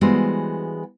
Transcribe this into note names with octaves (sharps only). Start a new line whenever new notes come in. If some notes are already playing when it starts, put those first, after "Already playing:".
E3 G3 G#3 B3 F#4 C5